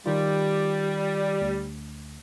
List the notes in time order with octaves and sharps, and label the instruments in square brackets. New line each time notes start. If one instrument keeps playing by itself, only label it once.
[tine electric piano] D#3 F4 [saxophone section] G3
[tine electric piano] D2